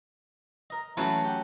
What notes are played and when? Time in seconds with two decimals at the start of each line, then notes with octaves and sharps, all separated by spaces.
0.70 A#4 D#5
0.97 E3 F#3 A3 C#4 B4 F5
1.25 G4 F#5